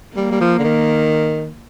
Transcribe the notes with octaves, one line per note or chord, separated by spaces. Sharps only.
G3 A#3
G3
F3
D3
D#3